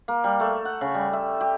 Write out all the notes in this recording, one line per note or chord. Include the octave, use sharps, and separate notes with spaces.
A#3
G3
A3
F#5
C#3
G3
E5
G4